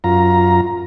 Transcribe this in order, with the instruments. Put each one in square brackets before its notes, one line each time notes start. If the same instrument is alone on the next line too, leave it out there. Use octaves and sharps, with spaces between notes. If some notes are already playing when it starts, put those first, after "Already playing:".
[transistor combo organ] F#2 F4 A#5